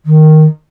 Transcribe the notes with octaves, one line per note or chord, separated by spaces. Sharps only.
D#3